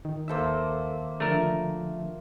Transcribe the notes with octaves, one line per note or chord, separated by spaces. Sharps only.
D#3
D#2 A#3 A4 C5 E5 E6
D3 F3 A3 A#4